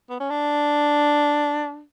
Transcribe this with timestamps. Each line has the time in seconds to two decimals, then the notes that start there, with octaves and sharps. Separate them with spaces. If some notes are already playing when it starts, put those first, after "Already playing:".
0.10 B3
0.20 C#4
0.30 D4